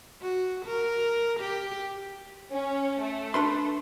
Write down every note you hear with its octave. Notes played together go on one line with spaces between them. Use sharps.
F#4
A#4
G4
C#4
A3
D4 B4 C6